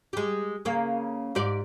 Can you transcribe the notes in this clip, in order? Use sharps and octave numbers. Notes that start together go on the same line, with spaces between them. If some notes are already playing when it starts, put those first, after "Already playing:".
G#3 G4
C#3 A#3
G#2 G4 D5